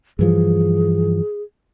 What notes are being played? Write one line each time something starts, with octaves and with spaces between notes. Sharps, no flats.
G2 E3 F3 G#4